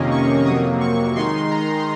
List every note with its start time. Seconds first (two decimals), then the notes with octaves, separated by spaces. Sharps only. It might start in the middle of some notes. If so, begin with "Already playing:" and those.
Already playing: F2 C3 D#3 A#3 C#4 D#5
0.11 C#6
0.46 F2 C3 F#3 A#3 D#6
0.81 C#6
1.16 D#3 G#3 D#4 C6
1.51 A#5